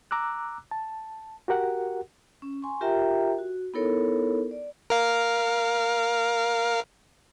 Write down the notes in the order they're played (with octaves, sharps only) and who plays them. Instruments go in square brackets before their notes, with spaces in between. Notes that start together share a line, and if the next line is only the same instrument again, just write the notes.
[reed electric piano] A#5 D6 E6 F#6
A5
F#4 G4 A#4 F#5
[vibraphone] C#4
G#5 C6 C#6
F4 G4 A#4 E5 G5 A#5
F#4
B3 D#4 E4 A4 A#4 C#5
D5
[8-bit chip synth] A#4 F5